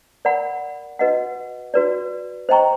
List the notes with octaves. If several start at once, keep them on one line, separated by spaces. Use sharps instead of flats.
A#4 D5 F#5 B5
F#4 B4 D#5 F#5
F#4 B4 D5
C5 D#5 G5 A#5 C#6